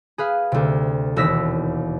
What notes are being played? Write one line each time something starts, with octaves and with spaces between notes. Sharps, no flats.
G#4 B4 F5
D2 C3
E1 D#2 E6 A#6 B6